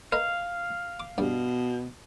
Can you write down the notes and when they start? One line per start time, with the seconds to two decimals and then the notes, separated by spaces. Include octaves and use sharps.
0.12 A#4 B4 D#5 F5
1.00 D6
1.18 G2 B2 G3